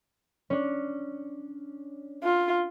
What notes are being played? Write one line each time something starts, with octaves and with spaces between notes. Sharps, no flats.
C#4 D4
F4